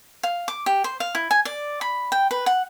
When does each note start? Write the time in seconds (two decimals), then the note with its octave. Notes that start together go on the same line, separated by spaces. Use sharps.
0.23 F5
0.48 D6
0.66 G4
0.84 C5
1.00 F5
1.15 E4
1.31 G#5
1.45 D5
1.81 B5
2.12 G5
2.31 B4
2.46 F#5